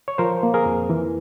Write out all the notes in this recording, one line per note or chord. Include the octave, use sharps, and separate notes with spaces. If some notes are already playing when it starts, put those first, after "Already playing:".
C#5
F3 A#4 C5
A#3
G#4 A#4
F2
E3